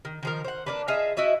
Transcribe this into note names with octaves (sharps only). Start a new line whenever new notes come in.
D#3
D#3 F3 A#4
C5 F#5
A#3 D4 B4
F4 G#4 D#5 E5
E4 F#4 D#5 E5